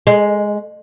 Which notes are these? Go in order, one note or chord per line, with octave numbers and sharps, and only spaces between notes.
G#3